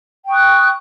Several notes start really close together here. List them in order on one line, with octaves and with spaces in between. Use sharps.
G5 C#6 D#6 F#6